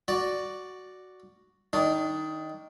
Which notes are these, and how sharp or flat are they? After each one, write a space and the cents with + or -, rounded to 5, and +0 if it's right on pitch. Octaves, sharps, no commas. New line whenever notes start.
F#4 +0 D5 +0
D#3 +10 D4 -15